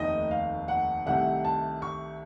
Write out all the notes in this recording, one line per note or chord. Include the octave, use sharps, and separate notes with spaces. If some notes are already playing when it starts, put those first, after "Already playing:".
Already playing: F1 D#2 D#3 A3 D#4 D#5
F5
F#5
C2 C3 D#3 A3 F#5
A5
C#6